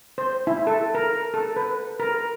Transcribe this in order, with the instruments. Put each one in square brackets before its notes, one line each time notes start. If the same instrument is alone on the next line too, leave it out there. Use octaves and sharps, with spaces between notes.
[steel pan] C5
E4
A4
A#4
A4
B4
A#4